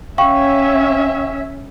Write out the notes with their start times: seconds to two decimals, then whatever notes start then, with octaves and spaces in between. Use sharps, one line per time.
0.18 C#4 E5 F5 G5 C#6